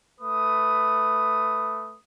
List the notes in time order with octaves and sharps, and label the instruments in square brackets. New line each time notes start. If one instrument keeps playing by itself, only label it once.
[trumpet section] A3 B4 D#6